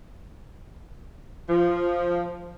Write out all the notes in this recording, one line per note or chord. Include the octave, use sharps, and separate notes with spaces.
F3